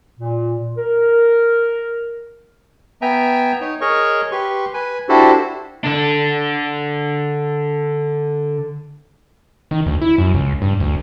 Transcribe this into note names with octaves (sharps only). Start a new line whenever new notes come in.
A#2
A#4
B3 E5 G5 G#5 A#5
D#4 C#5
G#4 A#4 C#5 D#5 C#6
G4 B4 C6 C#6
B4 G#5
D4 E4 F#4 G4 A4 C5
D3 D4
D#3
D2
E4
F#2
C#2
G2
D2